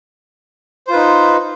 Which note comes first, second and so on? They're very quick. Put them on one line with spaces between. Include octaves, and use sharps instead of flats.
C5 F4 B4 D#4